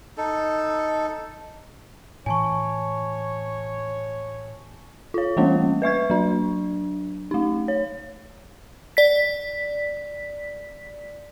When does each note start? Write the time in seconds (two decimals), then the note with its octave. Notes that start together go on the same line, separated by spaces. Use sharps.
0.17 D#4 A4
2.26 A2 E3 C#5 G#5 A5 C#6
5.14 F4 C#5
5.37 E3 G3 A3 A#3 C#4
5.82 B4 E5 C#6 G#6
6.10 F#3 D4
7.31 A3 D#4
7.68 C#5
8.97 D5 B6